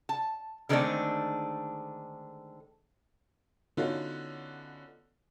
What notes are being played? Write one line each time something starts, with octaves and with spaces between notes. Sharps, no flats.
A5
D3 D#3 G#3 A3 C4 D4
D3 B3 C#4 D#4 F4 F#4